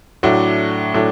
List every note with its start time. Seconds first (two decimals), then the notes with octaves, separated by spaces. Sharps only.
0.23 A2 F#3 A3 D4 F#4
0.94 A2 F#3 A3 D4